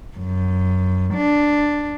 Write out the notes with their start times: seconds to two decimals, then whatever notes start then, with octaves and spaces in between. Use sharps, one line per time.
0.17 F#2
1.14 D4